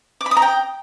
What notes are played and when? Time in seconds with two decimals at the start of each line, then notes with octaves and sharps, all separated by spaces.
0.21 D6
0.26 B5
0.31 D#6
0.37 A#5
0.42 G5